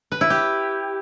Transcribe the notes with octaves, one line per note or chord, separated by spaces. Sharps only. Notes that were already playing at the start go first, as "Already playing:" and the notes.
B4
E4
G4